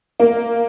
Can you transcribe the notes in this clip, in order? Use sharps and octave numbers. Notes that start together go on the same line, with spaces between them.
A#3